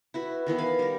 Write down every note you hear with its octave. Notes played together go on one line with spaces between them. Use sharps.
E4 F#4 B4
D#3 E3 B3 E4
F5 G#5 B5
G3 A#4